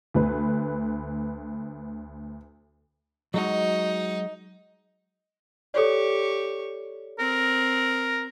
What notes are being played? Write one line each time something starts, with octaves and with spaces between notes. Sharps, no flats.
D2 B4
F#3 G#3 D#4 F#4
G4 A4 C#5 D5 C#6
C4 A#4